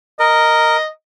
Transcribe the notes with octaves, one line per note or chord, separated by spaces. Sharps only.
A#4 D#5